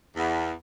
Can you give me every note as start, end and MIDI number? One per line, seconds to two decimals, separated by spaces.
0.16 0.52 40